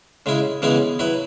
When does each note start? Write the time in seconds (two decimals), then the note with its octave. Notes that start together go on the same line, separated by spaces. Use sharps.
0.26 C#3 G#3 E4
0.62 C#3 E3 G#3 B3 E4
0.99 F#3 E4 B4